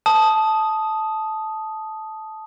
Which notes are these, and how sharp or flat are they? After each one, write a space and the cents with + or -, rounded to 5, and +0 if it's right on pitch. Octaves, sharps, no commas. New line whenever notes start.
A5 -10 D#6 +0